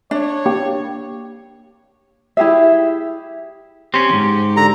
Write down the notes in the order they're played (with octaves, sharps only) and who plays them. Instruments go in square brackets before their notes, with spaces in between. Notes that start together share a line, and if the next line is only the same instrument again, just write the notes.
[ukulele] D4 [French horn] C#5
[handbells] A#3 G4 G5
[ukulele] E4 G4 G#4 E5
[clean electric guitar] C4 C#4 [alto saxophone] G4 [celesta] C6
[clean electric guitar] E2 G#2
[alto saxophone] D3 [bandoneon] A#5